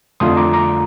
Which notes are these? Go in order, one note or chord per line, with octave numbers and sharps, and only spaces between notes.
F2 D3 A3 D4 F4 C6 D#6
A#5 D6
A#5 D6